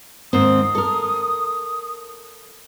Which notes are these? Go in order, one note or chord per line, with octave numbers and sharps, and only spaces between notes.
D#2 G#2 C4 D#6
A4 A#4